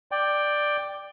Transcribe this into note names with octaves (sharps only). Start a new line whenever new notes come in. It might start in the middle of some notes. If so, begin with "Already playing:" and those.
D5 G5